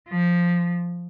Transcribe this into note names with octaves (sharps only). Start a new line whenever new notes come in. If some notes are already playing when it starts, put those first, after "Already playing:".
F3